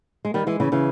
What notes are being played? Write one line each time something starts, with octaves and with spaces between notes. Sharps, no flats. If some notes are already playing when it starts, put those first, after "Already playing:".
G#3
D#3 G3
E3 G#3
C#3 E3
C#3 E3